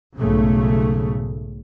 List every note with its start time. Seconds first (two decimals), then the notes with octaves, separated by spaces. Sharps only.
0.18 B1 G#2 C#3 A3